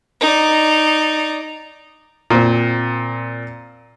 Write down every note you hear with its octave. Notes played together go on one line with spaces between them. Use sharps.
D#4 D5
A#2 C4